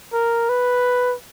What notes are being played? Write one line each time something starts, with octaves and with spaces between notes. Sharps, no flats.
A#4
B4